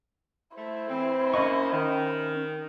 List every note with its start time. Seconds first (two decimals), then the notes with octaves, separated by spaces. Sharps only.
0.56 A3 E4 C5
0.89 E3 C4
1.34 A#3 C#4 D#5 F#5 C#6
1.72 D#3